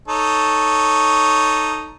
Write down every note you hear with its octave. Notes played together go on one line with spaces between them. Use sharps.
D#4 A4 C#5